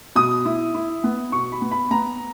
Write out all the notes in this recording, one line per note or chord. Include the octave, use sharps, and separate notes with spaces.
B2 D#6
E4
E4
B3
B2 C#6
B5
B3
B5
B3 A#5